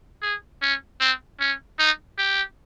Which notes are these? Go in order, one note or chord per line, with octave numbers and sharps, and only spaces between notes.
G#4
C#4
C4
C#4
D#4
G4